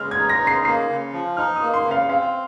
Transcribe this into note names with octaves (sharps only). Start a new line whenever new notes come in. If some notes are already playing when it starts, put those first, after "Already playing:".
Already playing: C#3 G#3 F6
G#6
D#4
A#6
C#3
C7
A#3 C7
C#3
F3
D#4 F6
D#6
A#3
C6
C#3
F5
C4 F5